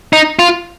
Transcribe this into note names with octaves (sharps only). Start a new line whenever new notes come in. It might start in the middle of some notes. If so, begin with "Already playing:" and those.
D#4
F4